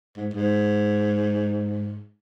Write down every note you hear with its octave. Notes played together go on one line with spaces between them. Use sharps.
G#2
G#2